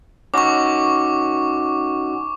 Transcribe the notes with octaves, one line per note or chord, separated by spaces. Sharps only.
C#4 D#4 F#4 C#6 D6